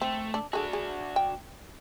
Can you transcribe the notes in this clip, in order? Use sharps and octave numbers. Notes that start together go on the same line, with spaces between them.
A3 C4
D4
D4 F#4 G#4 A4
G#4
G5